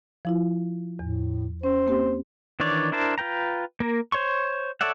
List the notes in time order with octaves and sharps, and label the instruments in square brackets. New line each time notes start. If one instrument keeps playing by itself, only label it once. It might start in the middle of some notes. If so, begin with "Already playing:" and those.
[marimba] F3 E4 F4
[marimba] E2 [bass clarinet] A2
[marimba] C#4 [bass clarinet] C5
[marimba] A#3 C4 G4
[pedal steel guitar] D#3 E3 D4 C#5 D5
D4 E4 A#4 C5 A5
F4 B4 G5 A#5
A#3 A#4
C5 C#5 C6 C#6
A4 C#5 D5 E5 F#5